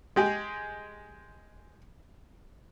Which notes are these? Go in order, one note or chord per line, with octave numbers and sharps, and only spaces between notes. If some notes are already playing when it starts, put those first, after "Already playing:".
G#3 G4 G#4